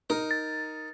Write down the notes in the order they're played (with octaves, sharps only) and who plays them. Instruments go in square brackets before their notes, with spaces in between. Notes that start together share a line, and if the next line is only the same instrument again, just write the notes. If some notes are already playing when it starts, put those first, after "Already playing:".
[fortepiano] D#4 [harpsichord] A#4
[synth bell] A6